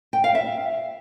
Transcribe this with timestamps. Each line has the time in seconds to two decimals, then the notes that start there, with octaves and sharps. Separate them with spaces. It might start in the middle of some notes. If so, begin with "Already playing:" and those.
0.13 G5
0.24 F5
0.35 E5